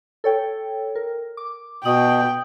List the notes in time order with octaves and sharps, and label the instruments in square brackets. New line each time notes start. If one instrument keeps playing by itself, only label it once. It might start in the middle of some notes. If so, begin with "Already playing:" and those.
[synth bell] A4 C#5 G5
A#4
D6
[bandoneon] B2 [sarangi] G5 [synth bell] D#6 F#7